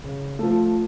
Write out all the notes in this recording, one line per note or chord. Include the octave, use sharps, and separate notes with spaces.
C#3
F3 A3